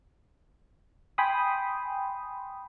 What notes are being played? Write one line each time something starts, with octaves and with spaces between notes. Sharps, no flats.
G5 G#5 B5 C6 D#6